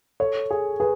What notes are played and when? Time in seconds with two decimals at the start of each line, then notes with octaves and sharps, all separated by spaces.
0.20 A4 C#5
0.51 G#4
0.80 G#4 B4